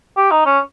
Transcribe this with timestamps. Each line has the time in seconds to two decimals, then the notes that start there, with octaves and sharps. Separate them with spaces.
0.17 G4
0.31 D#4
0.46 C#4